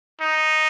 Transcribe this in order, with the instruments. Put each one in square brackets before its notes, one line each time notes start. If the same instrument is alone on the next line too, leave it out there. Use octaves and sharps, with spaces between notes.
[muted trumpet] D#4